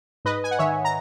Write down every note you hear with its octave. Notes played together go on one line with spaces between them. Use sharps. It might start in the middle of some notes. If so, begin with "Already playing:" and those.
G#2 B4 D#5
G#5
F#5
D#3 C#5 E5
A#5